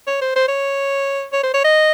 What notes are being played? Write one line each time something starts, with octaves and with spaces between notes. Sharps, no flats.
C#5
C5
C5
C#5
C#5
C5
C#5
D#5